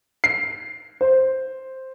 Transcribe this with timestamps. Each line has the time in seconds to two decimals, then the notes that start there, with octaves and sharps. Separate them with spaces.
0.24 C7
1.01 C5